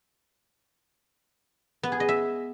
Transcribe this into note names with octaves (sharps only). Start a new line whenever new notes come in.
B3
G#4
D#5
E5